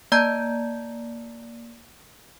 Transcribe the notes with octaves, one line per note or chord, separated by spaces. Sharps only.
A#3 D5 A5 A#5 G6 G#6